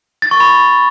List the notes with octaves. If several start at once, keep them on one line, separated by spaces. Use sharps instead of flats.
A6
C#6
B5